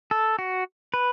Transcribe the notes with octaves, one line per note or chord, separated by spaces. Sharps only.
A4
F#4
B4